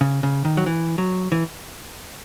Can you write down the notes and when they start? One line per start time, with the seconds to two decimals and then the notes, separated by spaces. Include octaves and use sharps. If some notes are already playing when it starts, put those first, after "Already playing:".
0.01 C#3
0.23 C#3
0.45 D#3
0.57 F#3
0.66 E3
0.98 F#3
1.32 E3